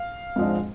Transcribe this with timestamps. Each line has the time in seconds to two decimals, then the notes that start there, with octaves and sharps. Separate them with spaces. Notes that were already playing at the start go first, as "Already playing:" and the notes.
Already playing: F5
0.36 G#2 F3 G#3 D4